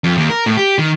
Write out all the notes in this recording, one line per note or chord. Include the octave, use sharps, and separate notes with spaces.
F2
D#2
A#4
A2
G4
D#3